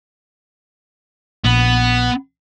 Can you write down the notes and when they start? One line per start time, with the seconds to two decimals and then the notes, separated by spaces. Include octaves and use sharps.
1.44 A#1 B3